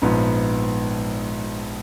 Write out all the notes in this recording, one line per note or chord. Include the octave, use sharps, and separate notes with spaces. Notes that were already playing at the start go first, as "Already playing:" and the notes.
A#1 G#2 F3 B3